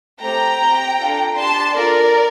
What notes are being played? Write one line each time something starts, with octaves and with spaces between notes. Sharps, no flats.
A3 C4 G4 G5 A#5
C4 G4
D4 F4 A4
D4 G4 A5 C6
D4 F4 A4 A#4 D5